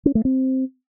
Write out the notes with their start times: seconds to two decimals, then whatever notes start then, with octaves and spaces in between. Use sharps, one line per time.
0.06 C#4
0.15 A3
0.25 C4